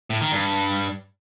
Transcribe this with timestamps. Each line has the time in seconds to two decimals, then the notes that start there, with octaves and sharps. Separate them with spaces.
0.10 A2
0.21 D#3
0.32 G2